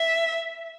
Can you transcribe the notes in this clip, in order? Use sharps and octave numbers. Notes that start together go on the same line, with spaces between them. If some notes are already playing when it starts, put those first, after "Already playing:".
Already playing: E5